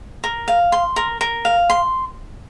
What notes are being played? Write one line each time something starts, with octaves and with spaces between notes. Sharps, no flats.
A#4
F5
C6
A#4
A#4
F5
C6